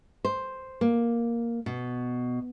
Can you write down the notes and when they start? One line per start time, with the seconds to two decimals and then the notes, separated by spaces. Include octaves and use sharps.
0.25 C5
0.81 A#3
1.66 B2